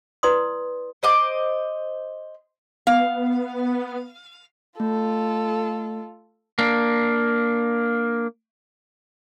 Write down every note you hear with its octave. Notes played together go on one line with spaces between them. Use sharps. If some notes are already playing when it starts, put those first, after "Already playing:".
E4 B4 D5 C6 D#6
C5 D#5 D6
B3 F5
A3 F4 A4
A#3 D4